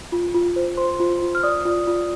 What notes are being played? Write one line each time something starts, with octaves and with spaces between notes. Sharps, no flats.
F4
F4
C5
C5 C6
F4
F4
F6
D5 D#6
F4
F4